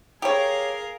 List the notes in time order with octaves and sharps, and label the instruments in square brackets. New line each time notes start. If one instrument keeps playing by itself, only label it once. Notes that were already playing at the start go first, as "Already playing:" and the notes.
[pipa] G4 C#5 [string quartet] G#4 A#4 F5